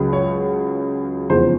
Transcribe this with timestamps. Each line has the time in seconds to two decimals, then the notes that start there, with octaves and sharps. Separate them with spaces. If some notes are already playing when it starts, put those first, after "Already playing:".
Already playing: C#2 C#3 F#3
0.13 C#5
1.30 F1 E2 C#3 F3 G#3 C5